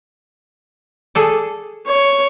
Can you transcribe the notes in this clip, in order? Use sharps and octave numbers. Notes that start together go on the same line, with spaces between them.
G#4 A4 D5
C#5